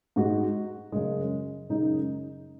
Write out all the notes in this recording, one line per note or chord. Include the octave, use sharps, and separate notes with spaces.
G#2 G#3 F#4
F#2 C#3 G#3
F#2 C#3 G#3 D#4